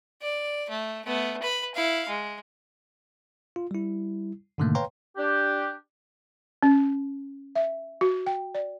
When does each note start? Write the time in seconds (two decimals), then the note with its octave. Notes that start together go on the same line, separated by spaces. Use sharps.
0.22 D5
0.70 A3
1.05 A3 B3
1.42 B4 B5
1.75 E4 F5
2.09 G#3
3.56 F4
3.71 G3 E4
4.58 G#2 B2 D3 D#3 A3 A#3
4.75 B4 C#5 F5 G5 A#5 C6
5.17 D4 G4
6.63 C#4
7.55 E5
8.01 F#4
8.27 G5
8.55 D5